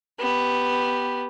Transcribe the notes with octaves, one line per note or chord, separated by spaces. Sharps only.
B3 G4